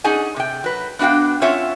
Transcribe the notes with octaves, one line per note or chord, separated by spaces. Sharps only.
C#4 D#4 G#4 D5 F#5 G#5
C3 G5
F#3 B4
B3 D4 F#4 F5 G5
C4 C#4 F4 C#5 E5 F#5